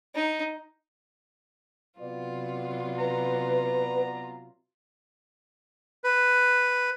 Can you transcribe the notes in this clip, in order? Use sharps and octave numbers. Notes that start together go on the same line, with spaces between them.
D#4
C3 F#3 B3 F4 D5
B4 A#5
B4